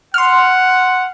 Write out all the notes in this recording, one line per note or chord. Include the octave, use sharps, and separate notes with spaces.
F#5 C6 F6